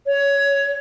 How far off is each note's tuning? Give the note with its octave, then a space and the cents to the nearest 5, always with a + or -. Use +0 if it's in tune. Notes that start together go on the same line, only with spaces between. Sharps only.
C#5 +15